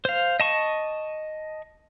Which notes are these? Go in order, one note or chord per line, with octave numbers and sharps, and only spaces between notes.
C5 F5
D#5 A5 C#6